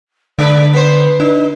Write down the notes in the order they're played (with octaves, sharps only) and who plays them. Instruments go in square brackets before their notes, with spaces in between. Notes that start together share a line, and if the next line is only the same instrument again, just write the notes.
[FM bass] D3 [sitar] G#3 D4 B4 [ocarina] D5
[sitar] B3 C5 [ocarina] B4
[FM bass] D4 [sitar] D#4